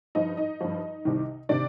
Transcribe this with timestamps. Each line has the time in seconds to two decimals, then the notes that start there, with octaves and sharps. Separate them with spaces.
0.15 G2 F3 D#4 D#5
0.37 D#4 D#5
0.61 G2 F3
1.05 C2 C3 D#3
1.49 C3 D#3 D4 D5